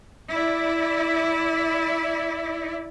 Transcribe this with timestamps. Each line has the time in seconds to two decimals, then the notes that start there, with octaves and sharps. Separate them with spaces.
0.29 E4 D5